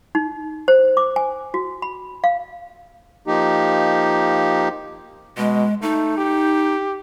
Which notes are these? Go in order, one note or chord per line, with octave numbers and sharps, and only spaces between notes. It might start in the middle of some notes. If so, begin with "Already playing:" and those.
D#4
C5
D6
G#5
F#4
B5
F5
F3 A#3 D#4 G4
B2 G#3
A3 D#4
G4